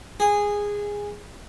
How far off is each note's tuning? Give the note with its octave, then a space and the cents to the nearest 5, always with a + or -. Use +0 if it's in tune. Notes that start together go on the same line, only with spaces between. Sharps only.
G#4 -15